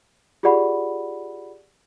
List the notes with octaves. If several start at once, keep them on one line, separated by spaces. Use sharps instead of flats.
F4 G4 G#4 D5 F#5 B5